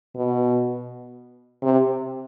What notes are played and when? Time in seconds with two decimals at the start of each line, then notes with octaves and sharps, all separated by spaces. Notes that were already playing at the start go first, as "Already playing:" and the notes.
0.16 B2
1.62 C3